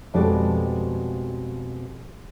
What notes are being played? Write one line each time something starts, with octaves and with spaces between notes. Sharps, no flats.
F2 B2 G3 G#3 F#4 D5